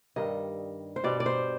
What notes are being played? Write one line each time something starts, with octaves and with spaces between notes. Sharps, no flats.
G2 D#3 G3 D#5
C5
B2 G3 D5
D5
C5